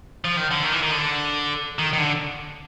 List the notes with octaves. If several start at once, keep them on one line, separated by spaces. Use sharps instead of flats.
F3
D#3
D3
D#3
E3
D#3
D3
D#3
D#3
D3